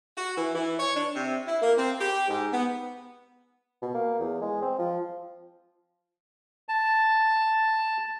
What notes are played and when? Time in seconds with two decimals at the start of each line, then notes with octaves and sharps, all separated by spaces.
0.16 F#4
0.36 E3
0.55 E3
0.79 C#5
0.94 D4
1.14 C3
1.46 E4
1.62 A#3
1.77 C4
1.99 G4
2.29 G#2
2.52 B3
3.82 B2
3.95 A#3
4.20 E2
4.41 G#3
4.62 C4
4.79 F3
6.69 A5